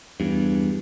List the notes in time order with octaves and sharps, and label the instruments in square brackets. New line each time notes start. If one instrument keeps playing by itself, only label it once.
[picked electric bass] E2 G2